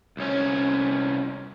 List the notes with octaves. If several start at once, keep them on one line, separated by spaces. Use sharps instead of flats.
C2 C#4